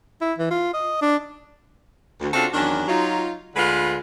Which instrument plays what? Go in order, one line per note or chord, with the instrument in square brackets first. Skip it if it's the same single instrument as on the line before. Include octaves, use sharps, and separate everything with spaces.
[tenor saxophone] E4
E3
F4
D#5
D4
[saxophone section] D2
C#3 C4 D4 F4 F#4 A4
E2 D#3 F#3 C#4 D4
F#3 D#4 F4
D2 D3 G#3 F4 B4